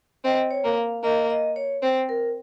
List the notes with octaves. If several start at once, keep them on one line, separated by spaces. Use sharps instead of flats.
C4 D#5
C#5
A#3
F5
A#3 D#5
D#5
C#5
C4 C5
A#4